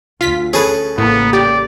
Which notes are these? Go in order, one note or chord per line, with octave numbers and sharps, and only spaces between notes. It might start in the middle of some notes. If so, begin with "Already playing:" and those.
D2 F4 B6
C#4 G#4 A4 B4
A1 A2 C#3 A#3 B3
G4 D5